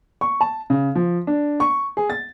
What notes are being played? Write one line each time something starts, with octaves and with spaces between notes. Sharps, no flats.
C#6
A5
C#3
F3
D4
C#6
G#4
A6